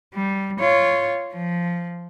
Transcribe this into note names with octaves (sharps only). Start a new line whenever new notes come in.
G3
F4 C#5
F3